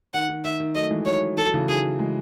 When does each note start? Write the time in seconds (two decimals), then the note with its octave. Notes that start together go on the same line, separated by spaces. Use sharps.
0.14 D#3 F#5
0.29 D#3
0.44 D#3 E5
0.60 D#3
0.75 F#3 A3 D#5
0.91 E3 G#3
1.06 D#3 F#3 C#5
1.37 E3 A4
1.46 F#3
1.54 C#3 E3
1.68 D#3 F#3 G#4
1.99 E3 G#3